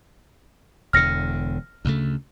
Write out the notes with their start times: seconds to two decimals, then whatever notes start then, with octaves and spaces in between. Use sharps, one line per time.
0.93 E1 E2 D3 F6 A#6 C#7
1.85 D2 C#3 A3